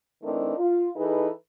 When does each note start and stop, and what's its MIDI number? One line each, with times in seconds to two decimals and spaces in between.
0.23 0.55 52
0.23 0.55 57
0.23 0.55 60
0.23 0.55 62
0.23 0.55 63
0.23 0.55 70
0.57 0.89 65
0.96 1.28 52
0.96 1.28 63
0.96 1.28 68
0.96 1.28 69
0.96 1.28 71